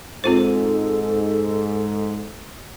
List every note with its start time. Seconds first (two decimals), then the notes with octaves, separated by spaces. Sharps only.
0.24 G#2 C4 F4 A4 C5